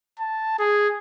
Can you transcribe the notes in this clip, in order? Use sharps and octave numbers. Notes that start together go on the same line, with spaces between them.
A5
G#4